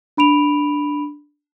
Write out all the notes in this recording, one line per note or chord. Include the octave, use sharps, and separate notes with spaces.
D4 B5 D7 F7